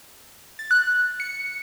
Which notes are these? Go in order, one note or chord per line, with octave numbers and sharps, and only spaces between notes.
A6
F#6
C#7